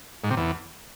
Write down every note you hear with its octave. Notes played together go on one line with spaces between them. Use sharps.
G#2
C3
E2